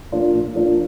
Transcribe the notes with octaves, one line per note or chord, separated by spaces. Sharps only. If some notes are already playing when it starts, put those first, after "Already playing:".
F3 A#3 D4 F4
A#2
F3 A#3 D4 F4